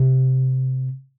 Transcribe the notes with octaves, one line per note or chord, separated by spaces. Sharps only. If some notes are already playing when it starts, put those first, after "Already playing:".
Already playing: C3